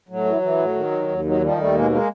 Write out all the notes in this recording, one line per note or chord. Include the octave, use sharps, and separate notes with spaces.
A2 F#3
E3
E3
A2
D#3
D#2
D#2
D#3 F#3
D#3 F3 G3
D#2 G3 A3
B2 G#3 A#3
G#3 A#3